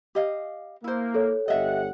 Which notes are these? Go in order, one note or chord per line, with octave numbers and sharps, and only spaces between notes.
G4 D#5 F5
A#3 E4 C5
A4 C#5
G1 G4 D#5 E5 F#5